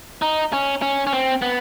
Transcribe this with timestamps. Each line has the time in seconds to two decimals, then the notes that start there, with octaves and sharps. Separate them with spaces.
0.22 D#4
0.53 C#4
0.82 C#4
1.07 C#4
1.13 C4
1.42 B3